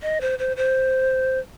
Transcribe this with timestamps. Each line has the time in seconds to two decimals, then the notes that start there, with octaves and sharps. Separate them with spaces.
0.02 D#5
0.21 C5
0.39 C5
0.57 C5